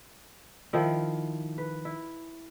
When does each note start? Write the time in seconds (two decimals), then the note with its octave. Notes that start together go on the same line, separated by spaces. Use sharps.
0.73 D#3 F3 E4
1.58 B4
1.85 E4